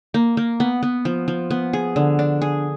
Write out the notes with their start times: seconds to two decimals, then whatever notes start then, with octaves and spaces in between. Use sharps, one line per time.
0.14 A#3
0.37 A#3
0.60 B3
0.83 B3
1.05 F3
1.28 F3
1.51 B3
1.73 G#4
1.96 D3
2.19 D4
2.41 G#4